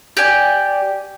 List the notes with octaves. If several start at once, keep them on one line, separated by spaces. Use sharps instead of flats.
G4 D5 G#5